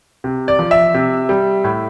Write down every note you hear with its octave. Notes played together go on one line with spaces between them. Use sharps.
C3
D5
F3
E5
C3
G3
A2